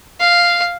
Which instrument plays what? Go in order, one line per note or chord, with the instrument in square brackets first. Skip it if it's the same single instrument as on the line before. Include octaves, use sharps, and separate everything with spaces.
[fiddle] F5